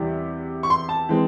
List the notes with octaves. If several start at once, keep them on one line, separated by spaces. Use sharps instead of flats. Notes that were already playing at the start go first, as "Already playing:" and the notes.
Already playing: E2 C3 E3 G3
C#6
C6
A5
E3 G#3 C4